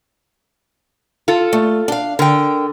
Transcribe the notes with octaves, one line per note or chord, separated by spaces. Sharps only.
F4 A4
A3
D4 F5
D3 A#4 G5